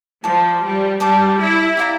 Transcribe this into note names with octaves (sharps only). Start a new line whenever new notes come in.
F3 D5 A5 D6
G3
G3 D5 A5 D6
E4
G4 D5 F5 A#5